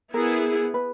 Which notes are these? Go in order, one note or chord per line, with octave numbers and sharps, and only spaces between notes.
B3 E4 G#4 A#4
B4